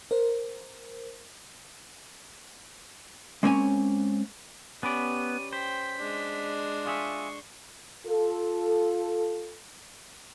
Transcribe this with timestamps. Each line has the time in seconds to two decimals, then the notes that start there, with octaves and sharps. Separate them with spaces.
0.11 A#4 C5
3.43 G#3 A#3 C4 C#4 C#5 G#5
4.83 B3 C#4 G4 B4 D5 D#7
5.53 C5 G5 B6
5.98 G#3 D4
6.85 F4 G#4 E5 C#6
8.06 F4 A4